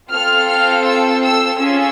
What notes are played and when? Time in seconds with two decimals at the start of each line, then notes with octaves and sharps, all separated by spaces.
0.10 C4 F4 A4 F6
0.46 F6
0.84 E6
1.22 E6
1.58 C#4 F4 G#4 E6